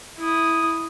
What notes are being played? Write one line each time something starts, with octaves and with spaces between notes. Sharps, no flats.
E4 D#6